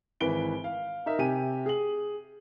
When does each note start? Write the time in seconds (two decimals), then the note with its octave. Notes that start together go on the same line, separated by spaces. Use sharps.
0.21 G#1 E3 B4 D7 G7
0.64 F5
1.06 D#4 A#4 E5
1.19 C3 G4 G#5 D#7
1.66 G#4 F#7